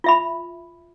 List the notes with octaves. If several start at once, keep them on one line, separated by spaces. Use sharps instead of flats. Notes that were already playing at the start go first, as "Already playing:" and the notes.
F4 E5 B5